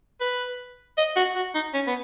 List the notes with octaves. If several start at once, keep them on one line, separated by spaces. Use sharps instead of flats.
B4
D#5
F#4
F#4
D#4
C#4
B3